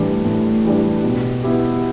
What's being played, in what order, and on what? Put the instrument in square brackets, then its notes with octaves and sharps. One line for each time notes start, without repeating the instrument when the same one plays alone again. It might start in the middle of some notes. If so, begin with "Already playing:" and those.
Already playing: [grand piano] A2 E3 G3 D4
A2
E3 G3 D4
B2
B3 E4 G4